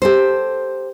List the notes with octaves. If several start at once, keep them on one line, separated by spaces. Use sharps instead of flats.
G4 A4 C5